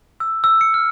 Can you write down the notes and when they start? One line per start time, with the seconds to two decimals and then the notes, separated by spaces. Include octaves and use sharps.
0.20 E6
0.44 E6
0.61 C#7
0.74 F6